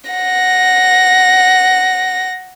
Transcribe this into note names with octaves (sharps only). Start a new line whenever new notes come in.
F#5 A#6